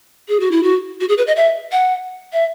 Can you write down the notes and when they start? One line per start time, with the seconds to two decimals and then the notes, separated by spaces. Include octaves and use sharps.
0.28 G#4
0.40 F#4
0.51 E4
0.63 F#4
1.00 F#4
1.09 G#4
1.18 B4
1.27 D#5
1.36 E5
1.72 F#5
2.33 E5